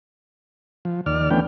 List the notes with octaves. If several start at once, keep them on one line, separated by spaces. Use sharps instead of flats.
F3
D#2 D5 F6
E3 A3 B3 C#4 D4 G5